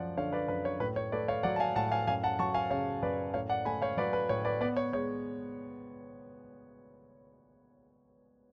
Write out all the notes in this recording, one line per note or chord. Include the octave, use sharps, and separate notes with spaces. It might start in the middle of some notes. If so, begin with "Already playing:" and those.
Already playing: F#2 F3 D5 F#5
D3 C#5 F5
B4 D5
F#2 B4
C#5
A2 B4
C#5
A3 B4 D5
C#5 F5
F#3 D5 F#5
A5
F5 G#5
A2 F#5 A5
F5 G#5
F#2 F5 G#5
F#5 A5
F#3 A5 C#6
F5 G#5
C#3 C#5 F5
F#2 B4 D5
A2 C#5 F5
D5 F#5
A3 G#5 B5
C#5 F5
F#3 B4 D5
B4
A2 C#5
B4 D5
B3 B4 D5
C#5
G#3 C#5